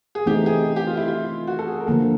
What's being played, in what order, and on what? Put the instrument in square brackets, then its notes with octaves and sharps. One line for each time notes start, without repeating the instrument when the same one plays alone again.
[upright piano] G#4
[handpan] E3 A3 C4 D#4 [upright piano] G4
[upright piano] G#4
G4
F4
E4
F4
F#4
A4
G#4
A#4
[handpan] D3 F3 A#3 [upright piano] A4